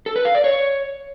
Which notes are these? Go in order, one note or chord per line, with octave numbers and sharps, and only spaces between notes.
A4
B4
F5
D5
C#5